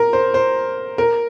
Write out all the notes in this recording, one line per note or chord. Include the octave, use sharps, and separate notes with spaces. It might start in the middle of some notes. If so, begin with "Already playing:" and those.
Already playing: A#4
C5
C5
A#4